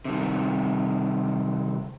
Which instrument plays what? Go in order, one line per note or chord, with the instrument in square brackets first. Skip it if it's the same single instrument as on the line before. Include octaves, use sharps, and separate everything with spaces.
[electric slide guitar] C3 D#3 G3